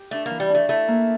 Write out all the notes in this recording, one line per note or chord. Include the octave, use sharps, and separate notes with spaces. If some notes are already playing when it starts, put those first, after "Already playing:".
Already playing: G4
A3 D4
E3 A#3
G3
A3 D4
A3 E4
A#3